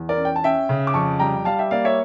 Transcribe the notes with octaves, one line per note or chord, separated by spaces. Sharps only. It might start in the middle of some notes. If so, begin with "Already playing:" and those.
Already playing: E2
A#4 D5
C#4
G5
A5
C#4 E5 G5
C#3
D6
F2 A5 C#6
G3 G5 A#5
G3 F5 A5
E5 G5
A#3 D5 F5
C#5 E5